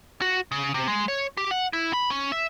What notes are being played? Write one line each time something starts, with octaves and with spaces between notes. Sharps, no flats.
F#4
C#3
C3
G#3
C#5
G4
F#5
E4
B5
C#4
E5